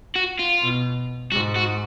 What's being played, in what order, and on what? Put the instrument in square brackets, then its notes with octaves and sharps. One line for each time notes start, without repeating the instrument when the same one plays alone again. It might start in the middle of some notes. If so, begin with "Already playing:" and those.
[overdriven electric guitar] F#4
F4
[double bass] B2
[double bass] G#2 [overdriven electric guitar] F#4
[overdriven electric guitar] F#4